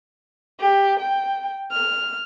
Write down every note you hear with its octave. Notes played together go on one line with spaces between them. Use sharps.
G4
G5
F6